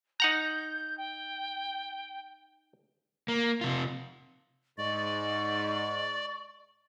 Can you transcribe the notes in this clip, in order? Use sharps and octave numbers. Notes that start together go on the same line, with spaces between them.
D#4 F#5 A#5 G6
G5
A#3
C3 F4
G#2 D5 D#5 C#6